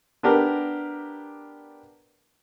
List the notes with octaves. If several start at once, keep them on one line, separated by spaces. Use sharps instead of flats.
B3 D4 G4 A#4